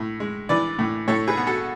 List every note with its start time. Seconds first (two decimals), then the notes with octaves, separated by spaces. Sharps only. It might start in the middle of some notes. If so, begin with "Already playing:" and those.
Already playing: A2
0.20 G#3
0.49 E3 B4 D5
0.79 A2
1.08 A2 A4 C#5
1.28 G#4 B4
1.37 B3
1.47 F#4 A4